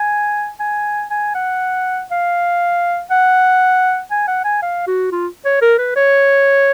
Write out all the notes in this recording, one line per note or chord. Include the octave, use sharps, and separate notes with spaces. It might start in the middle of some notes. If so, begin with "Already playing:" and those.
Already playing: G#5
G#5
G#5
F#5
F5
F#5
G#5
F#5
G#5
F5
F#4
F4
C#5
A#4
B4
C#5